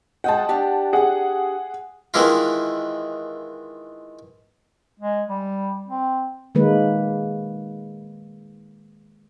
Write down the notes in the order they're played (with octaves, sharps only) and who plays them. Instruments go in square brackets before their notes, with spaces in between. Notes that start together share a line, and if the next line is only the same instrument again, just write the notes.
[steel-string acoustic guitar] G#3 D#5 G5 [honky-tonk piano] F#5 A5
[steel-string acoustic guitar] D4 G4
[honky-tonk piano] G#4 F#5
[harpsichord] D#3 E3 G#3 D4 E4 F4
[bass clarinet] G#3
G3
C4
[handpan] D#3 G#3 A#3 B4